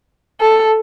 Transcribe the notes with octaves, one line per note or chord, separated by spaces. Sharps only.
A4